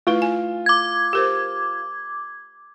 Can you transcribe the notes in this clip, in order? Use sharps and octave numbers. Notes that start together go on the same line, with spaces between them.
A3 E4 F4 B4
G#5
D6 G#6
G4 A#4 C5